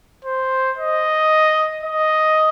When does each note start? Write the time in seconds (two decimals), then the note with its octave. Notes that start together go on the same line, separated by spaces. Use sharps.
0.25 C5
0.78 D#5
1.83 D#5